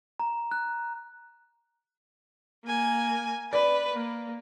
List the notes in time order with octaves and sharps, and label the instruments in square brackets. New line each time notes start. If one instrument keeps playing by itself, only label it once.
[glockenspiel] A#5
F#6
[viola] A#3 G#5
[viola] B4 [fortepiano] D5
[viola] A#3